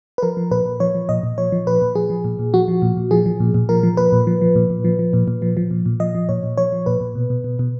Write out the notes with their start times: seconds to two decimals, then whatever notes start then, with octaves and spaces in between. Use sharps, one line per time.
0.18 B4
0.23 F3 A#4
0.37 F3
0.51 A#2 B4
0.65 A#2
0.80 F3 C#5
0.95 F3
1.09 A#2 D#5
1.23 A#2
1.38 F3 C#5
1.52 F3
1.67 A#2 B4
1.82 A#2
1.95 F3 G#4
2.10 F3
2.24 A#2
2.39 A#2
2.54 F3 F#4
2.68 F3
2.82 A#2
2.97 A#2
3.11 F3 G#4
3.26 F3
3.40 A#2
3.54 A#2
3.69 F3 A#4
3.83 F3
3.97 A#2 B4
4.12 A#2
4.27 F3
4.41 F3
4.56 A#2
4.70 A#2
4.84 F3
4.99 F3
5.13 A#2
5.28 A#2
5.42 F3
5.57 F3
5.71 A#2
5.86 A#2
6.00 F3 D#5
6.15 F3
6.29 A#2 C#5
6.43 A#2
6.57 F3 C#5
6.72 F3
6.86 A#2 B4
7.01 A#2
7.15 B2
7.30 B2
7.44 B2
7.59 B2